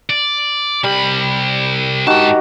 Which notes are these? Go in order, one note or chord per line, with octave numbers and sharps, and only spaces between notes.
D5
C2 G3 B5
G#2 D#3 F#4 G4 A5